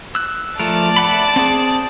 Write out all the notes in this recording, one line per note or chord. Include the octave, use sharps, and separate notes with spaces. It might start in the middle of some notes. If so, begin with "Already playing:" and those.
E6 F#6
F3 A3 A#4 D5 A5
E5 F#5 B5
C4 G#4